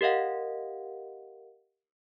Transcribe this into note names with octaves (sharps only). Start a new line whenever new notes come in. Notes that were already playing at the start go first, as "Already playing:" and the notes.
G4 A#4 D#5 F5 F#5